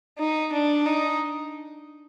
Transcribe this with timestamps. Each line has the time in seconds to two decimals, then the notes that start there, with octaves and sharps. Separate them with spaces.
0.18 D#4
0.52 D4
0.85 D#4